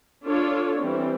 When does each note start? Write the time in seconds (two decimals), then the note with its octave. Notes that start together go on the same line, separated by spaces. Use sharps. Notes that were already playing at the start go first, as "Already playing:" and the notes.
0.26 D4 F4 A4 C#5
0.80 E3 G3 C4